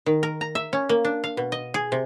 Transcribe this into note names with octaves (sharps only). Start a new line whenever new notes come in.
D#3
A#4
A#5
E5
C#4
A#3
D4
F5
B2
D#5
G#4
C3